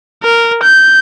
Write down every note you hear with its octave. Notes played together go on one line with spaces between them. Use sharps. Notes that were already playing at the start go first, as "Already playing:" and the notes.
A#4
G6